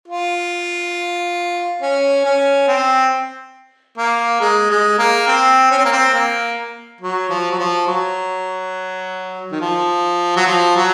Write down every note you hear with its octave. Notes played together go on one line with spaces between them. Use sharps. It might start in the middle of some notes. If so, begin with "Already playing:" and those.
F4
C#4
C#4
C4
A#3
G#3
G#3
A#3
C4
C#4
C4
A#3
C4
A#3
F#3
F3
F#3
F3
F#3
D#3
F3
F#3
F3
F#3